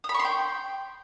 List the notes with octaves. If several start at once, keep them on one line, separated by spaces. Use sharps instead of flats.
D#6
B5
C#6
C6
G5